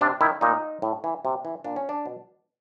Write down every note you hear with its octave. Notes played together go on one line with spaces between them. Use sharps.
C3 D4
D#3 E4
A#2 D#4
A2
E3
C3
E3
A#2 D4
C#4
D4
B2